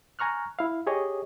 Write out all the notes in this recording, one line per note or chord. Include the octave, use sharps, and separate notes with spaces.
G#5 A#5 C#6 F6 F#6
E4 F5
G4 G#4 C#5 D#5